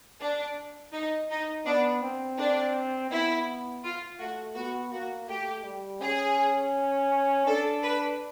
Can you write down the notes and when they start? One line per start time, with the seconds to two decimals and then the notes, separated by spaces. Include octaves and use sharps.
0.21 D4
0.93 D#4
1.30 D#4
1.65 B3 D4
2.02 C4
2.38 D4
3.11 B3 E4
3.84 F4
4.19 A3 F#4
4.56 B3 F#4
4.92 A#3 F#4
5.28 A3 G4
5.65 G3
6.02 C#4 G#4
7.46 D4 A4
7.83 B4